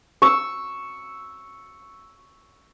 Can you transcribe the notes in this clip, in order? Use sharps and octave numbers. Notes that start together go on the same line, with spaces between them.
C#6 E6